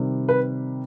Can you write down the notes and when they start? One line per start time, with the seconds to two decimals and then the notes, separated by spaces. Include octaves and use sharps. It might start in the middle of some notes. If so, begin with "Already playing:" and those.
Already playing: C3 D#3 G3
0.29 B4